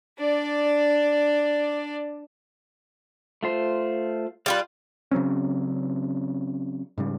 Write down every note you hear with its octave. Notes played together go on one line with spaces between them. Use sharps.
D4 D5
A3 F4 C5
G3 F4 B4 F5
C#3 F#3 C4 C#4
G#2 C#3 G3